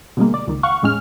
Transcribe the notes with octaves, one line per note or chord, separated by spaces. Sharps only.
B2 D3 G3 G#3 A#3
D5
C#2 D#3
F5 F#5 C#6
E2 A2 G#3 C#4 F6